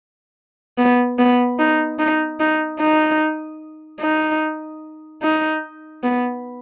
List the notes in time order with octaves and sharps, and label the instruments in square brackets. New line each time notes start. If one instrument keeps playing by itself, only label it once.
[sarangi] B3
B3
D#4
D#4
D#4
D#4
D#4
D#4
B3